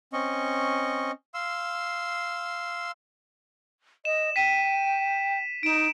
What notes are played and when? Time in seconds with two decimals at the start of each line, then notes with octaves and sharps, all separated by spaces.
0.13 C4 C#4 D#5 C#6
1.34 F5 C6 E6
4.05 D#5 E7
4.36 G5 B6 D#7
5.63 D#4 D7 E7